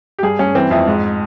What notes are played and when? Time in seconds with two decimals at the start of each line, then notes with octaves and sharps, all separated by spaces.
0.19 G4
0.23 G2 G#4
0.39 G2 C#4
0.55 E3 C4
0.71 F2 E4
0.87 G#2